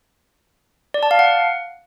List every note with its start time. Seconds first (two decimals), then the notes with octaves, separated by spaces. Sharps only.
0.94 D5
1.03 A5
1.11 F5
1.19 F#5